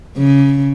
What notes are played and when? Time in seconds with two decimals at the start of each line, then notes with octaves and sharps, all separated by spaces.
0.17 C#3